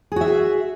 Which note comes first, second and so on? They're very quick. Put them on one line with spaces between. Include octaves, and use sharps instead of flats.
G#4 F#4 E5